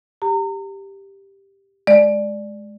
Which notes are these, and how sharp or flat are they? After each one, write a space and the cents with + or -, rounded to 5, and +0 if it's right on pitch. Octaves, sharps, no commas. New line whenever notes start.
G4 +0 A#5 -35
G#3 +15 D5 +5